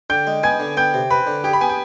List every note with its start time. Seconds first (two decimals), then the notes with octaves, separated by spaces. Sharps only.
0.10 D3 G5 G6
0.27 G#3
0.43 B3 G#5 G#6
0.60 D3
0.77 B3 G5 G6
0.94 C3
1.11 C4 B4 B5
1.27 D3
1.44 G4 G#4 G5
1.53 B5
1.61 B3 G#5
1.69 G5